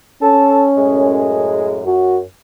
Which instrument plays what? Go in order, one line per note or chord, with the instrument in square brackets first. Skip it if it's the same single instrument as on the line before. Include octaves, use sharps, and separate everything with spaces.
[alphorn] C#4 [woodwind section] A4 A5
[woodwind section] F#2 A2 G#3
[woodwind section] F#2 [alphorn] F#4